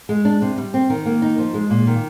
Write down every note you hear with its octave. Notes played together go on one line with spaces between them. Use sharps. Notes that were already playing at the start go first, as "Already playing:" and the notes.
G#3
D4
C3
G3
C4
D#3
A#3
D#4
F3
G#3
A#2
D#3